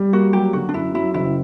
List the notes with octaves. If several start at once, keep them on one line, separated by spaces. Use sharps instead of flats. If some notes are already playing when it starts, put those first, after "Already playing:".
Already playing: G3
A#3 F#4
F#3 G4
D3 F#4
D4
F#2 E4
F#3 E4
F#1 E4